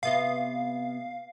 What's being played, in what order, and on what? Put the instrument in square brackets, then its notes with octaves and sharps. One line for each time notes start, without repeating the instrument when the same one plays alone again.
[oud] C3 B3 D#5 [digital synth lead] F5